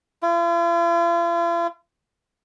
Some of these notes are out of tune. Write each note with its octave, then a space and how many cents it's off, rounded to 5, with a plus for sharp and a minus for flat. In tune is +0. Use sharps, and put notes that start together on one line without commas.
F4 -45